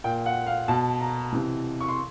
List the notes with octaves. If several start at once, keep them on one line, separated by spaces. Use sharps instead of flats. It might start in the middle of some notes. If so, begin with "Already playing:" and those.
A#2 G5
F#5
F5
B2 A5
A#5
C3 E3
C#6
C6